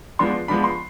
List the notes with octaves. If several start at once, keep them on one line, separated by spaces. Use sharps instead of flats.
F3 G#3 B3 D4 C6
F3 G#3 B3 D4 B5
C6